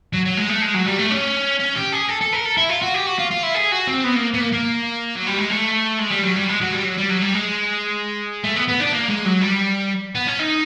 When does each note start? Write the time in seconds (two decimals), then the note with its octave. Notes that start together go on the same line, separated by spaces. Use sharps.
0.13 F#3
0.25 F#3
0.37 G#3
0.49 A3
0.62 G#3
0.74 F#3
0.86 G3
0.98 A3
1.11 C#4
1.59 C#4
1.76 G4
1.92 G#4
2.08 A4
2.21 A4
2.33 A#4
2.45 A4
2.57 E4
2.69 F4
2.82 F#4
2.94 G4
3.06 F#4
3.18 F4
3.31 F4
3.43 E4
3.55 G#4
3.72 F#4
3.87 C4
4.04 B3
4.16 A#3
4.34 B3
4.41 A#3
4.53 A#3
5.15 F#3
5.27 G3
5.39 G#3
5.51 A3
5.99 G#3
6.11 G3
6.23 F#3
6.36 G3
6.48 G#3
6.61 F#3
6.73 G3
6.85 F#3
6.97 G3
7.10 F#3
7.22 G3
7.34 G#3
8.44 A3
8.56 B3
8.68 B3
8.80 D4
8.92 A#3
9.09 G#3
9.25 F#3
9.41 G3
10.15 B3
10.27 C#4
10.39 D#4